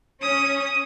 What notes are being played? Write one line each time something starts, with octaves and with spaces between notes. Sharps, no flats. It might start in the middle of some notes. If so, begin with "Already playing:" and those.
C#4 D#6